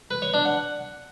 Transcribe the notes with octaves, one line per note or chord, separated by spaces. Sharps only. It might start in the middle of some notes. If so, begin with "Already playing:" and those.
B4
C#5
D4
F#5